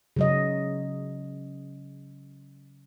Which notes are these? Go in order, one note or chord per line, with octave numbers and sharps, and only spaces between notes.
C#3 F#3 D#5